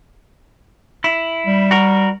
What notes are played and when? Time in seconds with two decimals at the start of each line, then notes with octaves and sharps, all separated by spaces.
1.04 E4
1.47 G3
1.71 F#4 A#4